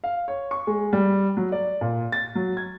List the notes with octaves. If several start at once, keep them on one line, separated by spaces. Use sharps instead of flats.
F5
C#5
C#6
G#3
G3
F#3
D5
A#2
A6
F#3
G#6